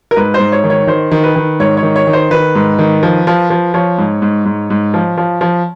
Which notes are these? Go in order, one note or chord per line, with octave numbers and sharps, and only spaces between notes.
A#4
G#2 B4
C5
G#2
C#5
D#3
C#5
D#3 C5
D#3
B4
D#3
G#2 C#5
C#5
D#3
C#5
D#3
C5
D#3 B4
G#2
D#3
F3
F3
F3
F3 C#5
G#2
G#2
G#2
G#2
F3
F3
F3